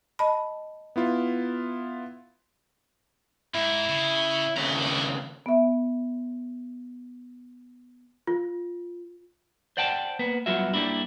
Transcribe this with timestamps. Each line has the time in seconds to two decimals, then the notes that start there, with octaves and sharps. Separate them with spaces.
0.19 D#5 A5 B5
0.96 B3 E4 F4
3.55 G#2 E4
3.89 C#3
4.57 D#2 C#3 E5 A#5
4.75 D3 E4
5.46 B3 E5
8.27 F4
9.77 C5 D5 F#5 G5 A5
10.19 A#3 B3 B4
10.46 F#3 G3 B3 F4 F#4 E5
10.73 G3 A#3 D4 E4